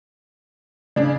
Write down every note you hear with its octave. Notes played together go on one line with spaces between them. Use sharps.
C#3 D4 D5